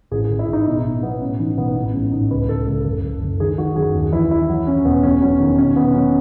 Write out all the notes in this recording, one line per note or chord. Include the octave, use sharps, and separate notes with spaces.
A1 G#4
G#4
A1
E4
A1 D#4
B2 D#4
B2
F#3 B3
A2 C#4
E3 D#4
B1 B3
A1 B3
G#2 C#4
A1 D#4
C#2 B4
C#2 A4
C#2 A4
F#1 A4
F#1
F#1
D#3 G#4
D#3 F#4
F#2 G#4
D#2
E3 E4
E3 E4
F#3
F#3 C#4
E1 B3
E2 C#4
F#3 C#4
D#3
B2 C#4
B2 B3
F#3 C#4